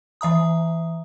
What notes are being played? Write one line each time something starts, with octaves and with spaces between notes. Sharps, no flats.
E3 E5 A#5 D#6